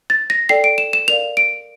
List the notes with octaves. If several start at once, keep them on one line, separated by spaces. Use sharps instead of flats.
A6
A#6
A4 D5 G5 C7
D7
E7
E7
A#4 D5 F5 F7
D7